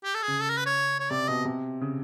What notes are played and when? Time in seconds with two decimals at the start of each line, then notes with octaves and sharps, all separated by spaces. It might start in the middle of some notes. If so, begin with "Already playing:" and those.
0.04 G4
0.15 A4
0.23 G#4
0.28 C#3
0.40 A4
0.49 A#4
0.58 B4
0.66 C#5
1.00 C#5
1.11 C3 D5
1.28 B2 D#5
1.45 C3
1.81 C#3